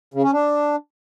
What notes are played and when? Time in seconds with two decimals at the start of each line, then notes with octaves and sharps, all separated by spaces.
0.14 C#3
0.23 C#4
0.33 D4